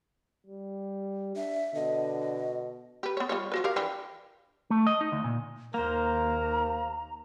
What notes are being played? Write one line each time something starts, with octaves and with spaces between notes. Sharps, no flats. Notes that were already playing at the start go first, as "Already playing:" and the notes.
G3
D4 E5
B2 D3 D#5
G4 B4
B3 C#5
G3 F4 C#5
F3 F#4 B4
G4 A#4 F5
E3 D4 G4
A3
D#5
D#4
D2
A#2
D#2 A#3 A#4 C5 A#5